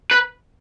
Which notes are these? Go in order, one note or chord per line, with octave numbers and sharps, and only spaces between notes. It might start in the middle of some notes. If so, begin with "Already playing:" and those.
B4